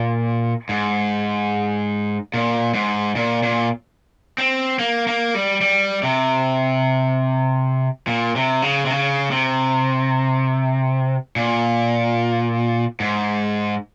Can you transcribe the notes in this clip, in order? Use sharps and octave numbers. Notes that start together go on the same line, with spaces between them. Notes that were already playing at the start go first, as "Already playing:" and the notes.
Already playing: A#2
G#2
A#2
G#2
A#2
A#2
C4
A#3
A#3
G3
G3
C3
A#2
C3
C#3
C3
C#3
C3
A#2
G#2